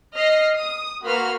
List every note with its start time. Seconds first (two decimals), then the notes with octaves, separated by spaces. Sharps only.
0.13 D#5 F6 A#6 C7
0.57 D#6
1.03 A#3 F#4 B4 B5 C6 F6